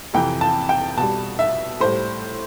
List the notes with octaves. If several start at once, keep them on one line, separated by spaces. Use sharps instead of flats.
F2 C3 E3 G5
A5
G5
B2 G3 A5
E5
A2 G3 C5